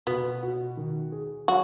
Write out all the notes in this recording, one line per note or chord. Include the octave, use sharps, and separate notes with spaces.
B2 B3
F#4
D#3
G#4
F#3 F#4